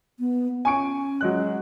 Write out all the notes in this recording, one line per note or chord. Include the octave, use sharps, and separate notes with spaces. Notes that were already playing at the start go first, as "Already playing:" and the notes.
B3
C#4 G#5 C#6 D7
F#3 G#3 F#6